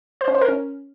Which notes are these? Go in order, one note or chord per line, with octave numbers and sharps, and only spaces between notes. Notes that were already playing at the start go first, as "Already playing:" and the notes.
C5
C#4
C5
A#4
C#4